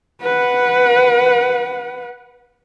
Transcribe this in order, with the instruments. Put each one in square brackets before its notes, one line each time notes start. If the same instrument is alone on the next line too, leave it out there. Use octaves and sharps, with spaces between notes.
[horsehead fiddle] B4 F#5